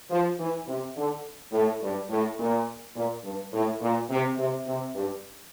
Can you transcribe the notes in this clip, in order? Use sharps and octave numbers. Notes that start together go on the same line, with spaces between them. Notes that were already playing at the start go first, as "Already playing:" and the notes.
F3
E3
C3
D3
A2
G2
A2
A#2
A#2
G2
A2
A#2
C3
C3
C3
G2